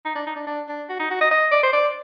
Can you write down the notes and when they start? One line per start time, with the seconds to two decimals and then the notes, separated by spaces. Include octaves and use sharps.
0.06 D#4
0.15 D4
0.27 D#4
0.36 D4
0.47 D4
0.68 D4
0.89 F#4
0.99 D#4
1.11 F#4
1.21 D#5
1.31 D#5
1.51 D5
1.63 C5
1.73 D5